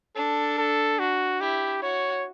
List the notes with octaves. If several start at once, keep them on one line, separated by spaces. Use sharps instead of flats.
D4 A4
A4
F#4
E4 G4
F#4 C#5